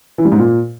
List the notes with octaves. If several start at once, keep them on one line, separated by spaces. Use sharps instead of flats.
E3
G3
G#2
A#2